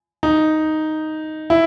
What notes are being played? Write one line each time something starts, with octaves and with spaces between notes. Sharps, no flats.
D#4
E4